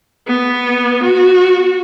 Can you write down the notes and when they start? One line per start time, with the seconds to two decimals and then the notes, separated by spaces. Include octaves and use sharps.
0.27 B3
1.03 F#4